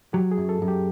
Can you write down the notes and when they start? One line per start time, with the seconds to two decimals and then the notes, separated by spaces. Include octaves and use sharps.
0.13 F#3 G4
0.31 G#4
0.38 F#2
0.49 A4
0.62 F#2
0.68 G4